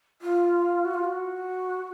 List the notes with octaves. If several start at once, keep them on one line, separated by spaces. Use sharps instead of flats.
F4
F#4
F4
F#4